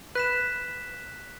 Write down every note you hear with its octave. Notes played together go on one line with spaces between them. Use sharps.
B4 F#6 B6 E7